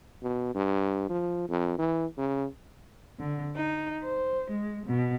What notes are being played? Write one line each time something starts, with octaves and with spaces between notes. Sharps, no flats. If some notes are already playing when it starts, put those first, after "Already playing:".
B2
G2
F3
F2
E3
C#3
D3
D#4
C5
G#3
B2